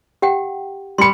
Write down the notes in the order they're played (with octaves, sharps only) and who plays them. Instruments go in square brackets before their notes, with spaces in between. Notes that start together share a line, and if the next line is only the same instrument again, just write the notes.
[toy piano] G4 F#5 G5
[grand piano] G3 C#7 [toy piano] B5 C6